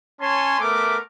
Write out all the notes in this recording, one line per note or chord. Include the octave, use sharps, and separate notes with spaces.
C#4 C#5 G#5 A5 C6
A3 B3 A#4 E5 D6